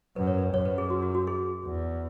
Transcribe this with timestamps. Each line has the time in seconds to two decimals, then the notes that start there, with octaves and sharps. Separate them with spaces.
0.16 F#2 B4
0.27 C#5
0.38 B4
0.54 F#2 C#5
0.65 B4
0.78 G#4
0.90 F#4
1.02 F#4
1.15 F#4
1.27 G#4
1.64 E2